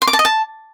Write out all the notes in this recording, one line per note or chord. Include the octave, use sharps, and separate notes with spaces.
C6
D6
A5
D#5
A5